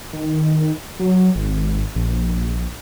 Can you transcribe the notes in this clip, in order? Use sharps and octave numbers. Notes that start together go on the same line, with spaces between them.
D#3
F#3
G#1
A#1